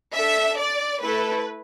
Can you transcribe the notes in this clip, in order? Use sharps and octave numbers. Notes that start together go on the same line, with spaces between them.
D4 A4 E5
D5
A3 E4 A4 B4